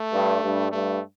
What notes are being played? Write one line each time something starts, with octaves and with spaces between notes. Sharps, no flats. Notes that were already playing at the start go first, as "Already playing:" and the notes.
Already playing: A3
G2
G2
G2 A3